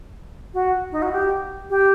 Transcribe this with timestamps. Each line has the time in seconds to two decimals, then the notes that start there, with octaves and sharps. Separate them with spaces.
0.54 F#4
0.92 D#4
1.02 F#4
1.12 G4
1.70 G4